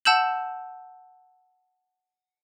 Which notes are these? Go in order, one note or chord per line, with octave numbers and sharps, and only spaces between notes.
F#5 A5 E6 G6 E7 F#7